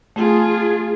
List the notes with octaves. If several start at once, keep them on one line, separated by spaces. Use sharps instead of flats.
A3 F4 G#4